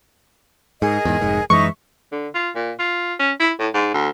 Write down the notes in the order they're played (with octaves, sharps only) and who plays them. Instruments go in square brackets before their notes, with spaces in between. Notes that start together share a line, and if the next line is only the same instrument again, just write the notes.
[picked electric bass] G#2 [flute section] G#4 A#4 D#5
[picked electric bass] E2 G#2
F1 G#2
[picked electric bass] F#2 E3 G#3 [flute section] D#4 E5 A#5 [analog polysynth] C#6
[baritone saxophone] D3
F4
A#2
F4
C#4
E4
A2
G#2
D2